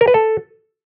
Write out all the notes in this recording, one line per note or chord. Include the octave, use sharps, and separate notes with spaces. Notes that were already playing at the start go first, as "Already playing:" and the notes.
A#4
B4
A4